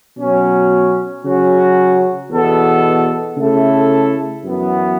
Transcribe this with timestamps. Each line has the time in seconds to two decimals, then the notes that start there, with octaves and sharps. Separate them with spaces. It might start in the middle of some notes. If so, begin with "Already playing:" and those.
0.18 B2 F#3 C#4
1.24 C#3 F#3 C#4 F#4
2.30 E2 B2 B3 A4
3.37 C#3 A3 E4 A4
4.44 F#2 E3 B3